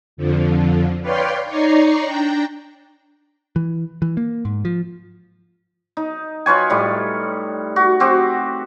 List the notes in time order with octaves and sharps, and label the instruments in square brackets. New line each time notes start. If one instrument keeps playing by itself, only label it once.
[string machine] F2 D3 F3
B4 C#5 D5 F5 G5 C6
D#4 C#5 D5 A#5 C#6 C7
D4 G5 A#5
[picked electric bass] E3
E3
A#3
G#2
F3
[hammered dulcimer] D#4
F4 B4 C#5 G#5
A2 G3
F#4
C4 F#4 G4